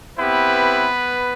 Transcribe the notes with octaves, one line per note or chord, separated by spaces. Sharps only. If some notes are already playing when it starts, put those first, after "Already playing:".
B3 C4 E4 G4 B4